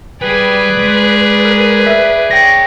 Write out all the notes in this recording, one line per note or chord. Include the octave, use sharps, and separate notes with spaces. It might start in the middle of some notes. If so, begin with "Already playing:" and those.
G3 G#4 B4 D5 G5
G#3
A#4
E5
A#4 C#5 G5 A#6